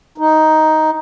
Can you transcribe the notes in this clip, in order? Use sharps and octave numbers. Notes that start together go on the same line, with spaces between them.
D#4